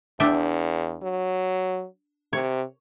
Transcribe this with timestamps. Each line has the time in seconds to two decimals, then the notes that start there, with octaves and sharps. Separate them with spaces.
0.20 E2 D4 E5 G5
1.03 F#3
2.33 C3 C#5